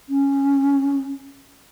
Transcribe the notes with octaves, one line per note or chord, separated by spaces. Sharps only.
C#4